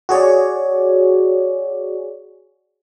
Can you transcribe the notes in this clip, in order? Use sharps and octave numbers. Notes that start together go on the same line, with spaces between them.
F#4 G#4 C#5 D5